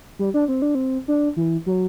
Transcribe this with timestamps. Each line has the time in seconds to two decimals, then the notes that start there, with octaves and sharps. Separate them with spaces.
0.19 G3
0.34 D4
0.48 C4
0.62 D4
0.75 C4
1.08 D4
1.36 E3
1.66 F#3